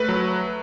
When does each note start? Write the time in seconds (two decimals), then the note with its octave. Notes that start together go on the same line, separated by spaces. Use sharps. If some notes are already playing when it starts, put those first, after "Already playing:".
Already playing: A3 B4
0.09 F#3